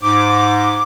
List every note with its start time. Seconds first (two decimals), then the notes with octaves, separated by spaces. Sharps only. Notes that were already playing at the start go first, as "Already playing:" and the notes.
0.01 G#2 D6